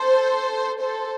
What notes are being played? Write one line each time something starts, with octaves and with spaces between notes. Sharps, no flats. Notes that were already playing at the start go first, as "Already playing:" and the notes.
Already playing: A4 C5
A4 C5